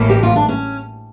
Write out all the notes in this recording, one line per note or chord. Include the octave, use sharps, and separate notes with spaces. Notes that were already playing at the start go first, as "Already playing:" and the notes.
Already playing: A1 A2 E3 A#3
G4
F4
D4
C#4